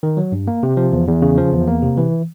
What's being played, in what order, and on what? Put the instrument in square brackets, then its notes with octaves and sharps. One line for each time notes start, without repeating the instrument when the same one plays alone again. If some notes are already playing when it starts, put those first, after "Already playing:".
[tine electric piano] D#3
F#3
G2
A#3
C3
F3
E2
E2
C#3
F3
E2
A#3
C3
E3